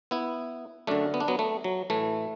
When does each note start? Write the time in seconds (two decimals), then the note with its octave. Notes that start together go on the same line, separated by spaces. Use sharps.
0.11 B3 E4
0.87 F#2 D3 A3 D4
1.14 B3
1.20 D4
1.28 F#3 B3
1.39 A3
1.64 F#3
1.90 A2 E3 A3